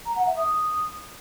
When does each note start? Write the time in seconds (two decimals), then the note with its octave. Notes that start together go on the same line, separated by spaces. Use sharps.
0.05 A#5
0.16 F#5
0.26 E5
0.37 D#6